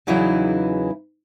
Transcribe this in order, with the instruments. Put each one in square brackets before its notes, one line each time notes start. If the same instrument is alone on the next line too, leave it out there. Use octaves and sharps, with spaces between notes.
[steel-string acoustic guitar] E2 C#3 E3 F#3 D#4 E4